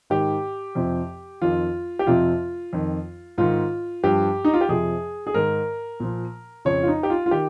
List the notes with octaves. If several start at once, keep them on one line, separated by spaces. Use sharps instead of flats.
G#2 D#3 G4
F2 C3 F3
F2 D#3 F4
G4
F2 C3 F3 F4
F2 D#3
G#2 D#3 F4
G2 F3 G4
D#4
F4
G4
F2 C3 F3 G#4
G#4
G#2 D#3 A#4
A#2 F3
F2 C#3 F3 C#5
F4
D#4
G4
F4
F4
D#3 G4